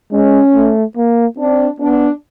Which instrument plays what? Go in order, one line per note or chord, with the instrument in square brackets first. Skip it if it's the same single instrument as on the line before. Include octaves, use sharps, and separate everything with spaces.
[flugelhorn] G#3 [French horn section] C#4
[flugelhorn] A3
A#3
[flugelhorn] C4 [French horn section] D4
[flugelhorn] B3 [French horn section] D4